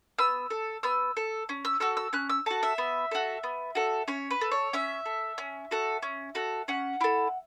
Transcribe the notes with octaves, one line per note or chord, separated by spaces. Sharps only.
B3 E6
A4
B3 E6
A4
C#4
E6
F#4 A4 E6
E6
C#4 F#6
E6
F#4 A4 A5
E5
B3
F#4 A4
B3
F#4 A4
C#4 C#5
B4
A4
C#5
C#4 E5
A4
C#4
F#4 A4
C#4
F#4 A4
C#4 F#5
E4 A4